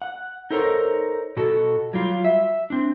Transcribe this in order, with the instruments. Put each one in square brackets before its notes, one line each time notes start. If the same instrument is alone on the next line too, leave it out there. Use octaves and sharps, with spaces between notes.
[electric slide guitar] F#5
D#4 A4 A#4 C5 C#5 A#5
B2 F#4 A4
F#3 G3 F4
E5
C4 D4